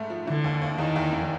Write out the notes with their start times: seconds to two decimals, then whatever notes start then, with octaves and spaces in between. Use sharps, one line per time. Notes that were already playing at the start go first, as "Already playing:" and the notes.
Already playing: G#2 A3
0.10 F3
0.27 D3 E3
0.44 D#2
0.62 D#2
0.78 E2 D#3
0.96 E2
1.12 F1